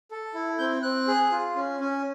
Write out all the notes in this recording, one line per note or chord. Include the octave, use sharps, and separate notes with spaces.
A4
E4
C4 G6
C4 F#6
G#4
F4
C#4
C#4